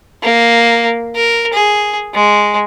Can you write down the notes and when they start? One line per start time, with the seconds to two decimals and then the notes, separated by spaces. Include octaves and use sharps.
0.23 A#3
1.15 A#4
1.53 G#4
2.15 G#3